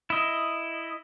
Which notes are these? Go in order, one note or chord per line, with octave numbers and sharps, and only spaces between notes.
E4 D#5